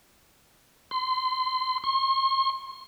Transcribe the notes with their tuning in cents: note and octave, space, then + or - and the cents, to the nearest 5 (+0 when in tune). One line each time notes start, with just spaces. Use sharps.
C6 -25
C6 +40